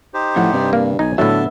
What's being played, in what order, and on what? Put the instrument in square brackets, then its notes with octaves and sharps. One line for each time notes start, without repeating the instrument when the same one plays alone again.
[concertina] D#4 G4 C5
[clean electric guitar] F#2 F3 F#5 [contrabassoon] A2
[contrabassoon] G2 [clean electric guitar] C3 D4
[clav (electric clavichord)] A#3
[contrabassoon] B1 [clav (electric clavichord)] D#4 [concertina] G#5
[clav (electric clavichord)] A2 F#3 [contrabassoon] D3 [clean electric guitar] B3 E5 [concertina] A4 A5